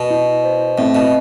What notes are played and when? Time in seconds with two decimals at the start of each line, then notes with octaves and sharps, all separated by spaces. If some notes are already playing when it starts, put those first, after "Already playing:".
Already playing: B2
0.11 E4
0.44 C5
0.78 A2 C4
0.95 B2